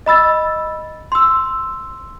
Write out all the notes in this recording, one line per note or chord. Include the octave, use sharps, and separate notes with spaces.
D#5 B5 E6 A6
C6 E6